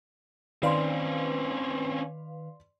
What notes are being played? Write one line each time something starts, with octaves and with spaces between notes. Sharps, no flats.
D#3 C4 C#4 B4 D5 F5 C6